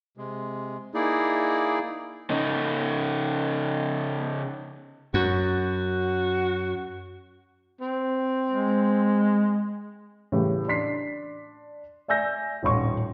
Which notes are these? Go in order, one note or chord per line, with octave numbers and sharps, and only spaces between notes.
C3 G#3
A#3 D#4 E4 G#4 D5
C#3 D#4
F#2 F#4
C4
G#3
A2 C#3 E3 G3
D4 C6 B6 C7
D5 E5 G#5 E6 G6 A#6
D#1 A1 C#4 C6 C#6